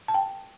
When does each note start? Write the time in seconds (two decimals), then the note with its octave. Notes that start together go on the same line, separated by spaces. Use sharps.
0.08 A5
0.14 G5